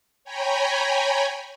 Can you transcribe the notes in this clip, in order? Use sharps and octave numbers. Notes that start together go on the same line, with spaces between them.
C#5 G5 G#5 A#5 B5